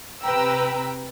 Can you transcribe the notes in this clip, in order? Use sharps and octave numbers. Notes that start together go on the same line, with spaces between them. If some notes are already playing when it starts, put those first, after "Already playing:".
C3 B4 G5 A#5 E6